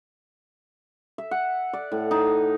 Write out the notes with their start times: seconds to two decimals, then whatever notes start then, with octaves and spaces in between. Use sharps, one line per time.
1.18 E5
1.31 F#5
1.73 D5
1.92 A2
2.11 D#4